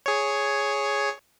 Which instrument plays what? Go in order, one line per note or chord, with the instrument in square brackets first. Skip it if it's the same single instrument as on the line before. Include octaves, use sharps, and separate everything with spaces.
[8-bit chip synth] G#4 C#5